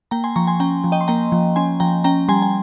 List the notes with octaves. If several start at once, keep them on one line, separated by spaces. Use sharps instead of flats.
A#3 G5 A#5
G#5 C6
F3 A#5 C#6
G#5 C6
C#4 G5 A#5
F3
D#5 G5
C6
A#3 G5 A#5
F3
C#4 G#5 C6
F3 G5 A#5
C#4 G5 A#5
G3 G#5 C6
G#5